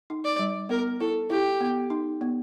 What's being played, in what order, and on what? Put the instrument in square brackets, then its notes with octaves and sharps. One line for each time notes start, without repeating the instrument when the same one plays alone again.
[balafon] D#4
[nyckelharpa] D5
[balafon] G3
[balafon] B3 [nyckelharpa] A#4
[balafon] E4 [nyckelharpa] A4
[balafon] E4 [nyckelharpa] G4
[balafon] B3
D#4
B3